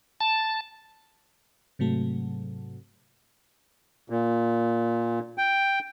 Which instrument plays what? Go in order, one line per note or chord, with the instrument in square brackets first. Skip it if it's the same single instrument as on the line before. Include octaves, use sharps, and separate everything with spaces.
[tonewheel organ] A5
[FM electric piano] G#2 C3 F#3 A3
[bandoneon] A#2
G5